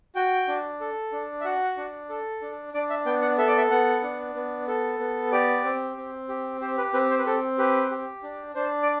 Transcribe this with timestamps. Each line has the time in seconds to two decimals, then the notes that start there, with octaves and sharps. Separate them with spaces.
0.15 F#4 G5
0.48 D4
0.81 A4
1.12 D4
1.41 E5
1.45 F#4 F#5
1.77 D4
2.09 A4
2.42 D4
2.74 D4 D5
2.90 E5
3.06 B3 G5
3.22 F#5
3.38 A4 E5
3.47 D5
3.58 E5
3.71 B3 F#5
4.03 D4
4.35 B3
4.68 A4
4.99 B3
5.32 G4 D5
5.64 C4
5.97 C4
6.29 G4
6.61 G4 C5
6.78 B4
6.93 C4 B4
7.10 C5
7.19 B4
7.26 C4 A4
7.58 G4 B4
7.91 G4
8.23 D4
8.55 D4 C5
8.83 D5